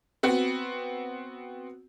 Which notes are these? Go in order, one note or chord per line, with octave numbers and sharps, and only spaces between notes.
B3 C4 F#4